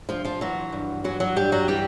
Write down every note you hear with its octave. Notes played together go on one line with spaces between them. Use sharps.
G2 F3 F4
F3 F4
E3 F#3 F#4
G2
E3 F#3 F#4
F#3 F#4
G2 G3 G4
F#3 F#4
E3 G3 G4